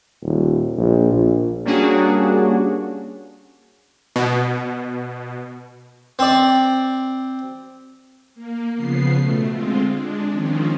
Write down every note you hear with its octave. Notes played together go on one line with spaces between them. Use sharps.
D#1
A#1
A#1
G3 A#3 C#4 D4 F#4 G#4
B2
C4 D5
A#3
C#3 F3 B3 C7
B2 A3
D3 G#3 C4 F4
G#3 D4
D#3 F3 C4 C#4